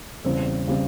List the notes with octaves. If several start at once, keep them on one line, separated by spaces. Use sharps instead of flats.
E2 C#3 G3 C4
C#3 G3 C4